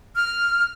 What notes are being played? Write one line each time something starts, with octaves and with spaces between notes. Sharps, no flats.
F6